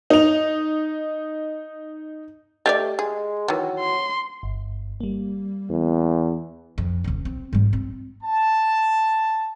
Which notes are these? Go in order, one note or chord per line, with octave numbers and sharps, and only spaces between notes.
D#4 F7
A3 G4 G#4 D5 D#5
G#3 G#4
D#3 E3 F#3
C6
G1
G3 A#3
E2
F2
D#1 C#2
C4
G#2 G3
C4
A5